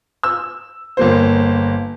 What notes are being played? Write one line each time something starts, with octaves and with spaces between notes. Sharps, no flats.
E6
G1 A#3 C5